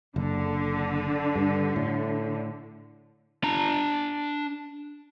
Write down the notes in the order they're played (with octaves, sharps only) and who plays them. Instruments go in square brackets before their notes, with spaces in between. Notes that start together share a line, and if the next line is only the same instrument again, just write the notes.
[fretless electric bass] F#1 [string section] D3
[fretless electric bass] G2
A2
[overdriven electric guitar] D4 A#5